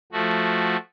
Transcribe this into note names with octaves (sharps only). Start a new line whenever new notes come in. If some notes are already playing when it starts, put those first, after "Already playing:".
F3 A3 F#4